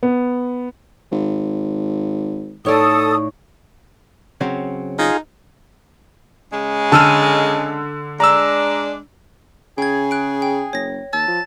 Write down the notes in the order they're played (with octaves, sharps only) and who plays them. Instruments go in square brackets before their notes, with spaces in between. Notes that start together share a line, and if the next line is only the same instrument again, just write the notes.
[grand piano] B3
[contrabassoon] G#1
[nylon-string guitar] A2 C#5 D5 [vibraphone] D#4 C#6 [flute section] A4 D#6
[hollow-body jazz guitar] C#3 F#3 C4
[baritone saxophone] D#4 [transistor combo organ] F4 G#4
[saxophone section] C#3 G#3
[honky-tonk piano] D3 D#7 [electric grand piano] A5 E6 F6
[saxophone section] G#3 D4 [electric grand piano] A#5 E6
[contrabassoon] C#3 [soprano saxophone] G#4 [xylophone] G5 G#6
[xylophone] F#6 D7
G5
[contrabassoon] F#1 [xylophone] C#5 A#6
[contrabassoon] D#2 [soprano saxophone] A5 [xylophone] E6
[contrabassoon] F3